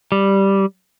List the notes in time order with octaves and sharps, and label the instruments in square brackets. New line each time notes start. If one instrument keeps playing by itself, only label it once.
[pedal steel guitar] G3